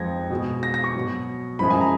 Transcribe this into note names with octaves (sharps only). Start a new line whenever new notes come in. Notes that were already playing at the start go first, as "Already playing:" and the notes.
Already playing: F2 F3 G#3 G#6 A#6
B2 G#3
A#6
A#6
C#6
B2 F#3
F#2 F3 G#3 B5
G#5
A#5